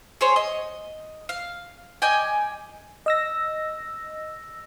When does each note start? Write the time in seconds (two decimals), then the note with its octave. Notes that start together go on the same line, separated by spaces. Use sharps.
0.21 G#4 C5 C#5
0.36 D#5
1.29 F5
2.02 D5 D#5 G5 G#5
3.06 D#5 E6 A#6